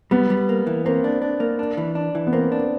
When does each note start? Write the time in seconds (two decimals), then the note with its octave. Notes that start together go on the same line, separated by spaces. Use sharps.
0.11 G3 B3
0.30 G3
0.49 A#3
0.67 E3
0.85 A#3 C4
1.04 D4
1.22 D4
1.40 A#3
1.59 D4
1.77 E3
1.95 D4
2.15 E3
2.27 B3
2.33 A#3 C4
2.52 D4